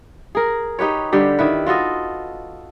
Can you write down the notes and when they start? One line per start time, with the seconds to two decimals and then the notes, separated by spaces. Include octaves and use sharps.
0.35 G#4 A#4
0.79 D#4 G4 B4 C#5
1.12 D3 G3 G4
1.39 D#3 E4 B4
1.66 F4 F#4 A4 D#5